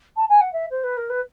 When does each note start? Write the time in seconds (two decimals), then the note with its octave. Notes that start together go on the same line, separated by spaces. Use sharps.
0.16 A5
0.29 G#5
0.41 F#5
0.53 E5
0.70 C5
0.83 B4
0.97 A#4
1.09 B4